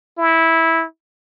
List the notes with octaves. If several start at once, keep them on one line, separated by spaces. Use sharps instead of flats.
E4